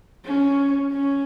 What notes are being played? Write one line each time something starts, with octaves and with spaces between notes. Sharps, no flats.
C#4
C#4